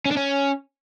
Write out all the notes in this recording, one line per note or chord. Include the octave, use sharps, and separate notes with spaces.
C#4
D4
C#4